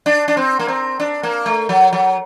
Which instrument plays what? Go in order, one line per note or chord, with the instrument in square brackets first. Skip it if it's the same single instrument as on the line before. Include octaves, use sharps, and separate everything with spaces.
[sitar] D4
D4
C4
A#3
C4
D4
A#3
A3
F#3
F#3